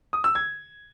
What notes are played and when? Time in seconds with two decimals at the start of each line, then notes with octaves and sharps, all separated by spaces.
0.13 D#6
0.24 E6
0.35 G#6